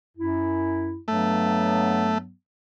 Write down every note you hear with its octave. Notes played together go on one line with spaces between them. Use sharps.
F#2 E4
G2 F#3 A3 B3